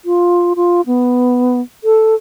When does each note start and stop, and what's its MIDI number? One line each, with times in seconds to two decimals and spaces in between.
0.05 0.53 65
0.56 0.81 65
0.87 1.61 59
1.84 2.15 69